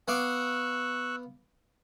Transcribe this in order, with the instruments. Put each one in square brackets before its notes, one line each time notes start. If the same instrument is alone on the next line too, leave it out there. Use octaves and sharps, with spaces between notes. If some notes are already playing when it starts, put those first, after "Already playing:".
[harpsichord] B3 F5 D6 [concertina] C#6 E6 F#6